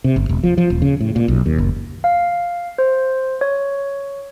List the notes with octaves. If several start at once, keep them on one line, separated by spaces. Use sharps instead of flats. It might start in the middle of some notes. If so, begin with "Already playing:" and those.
C3
G1
E1
F3
F3
D#1
C#3
A2
A#2
B1
D#2
F#1
F5
C5
C#5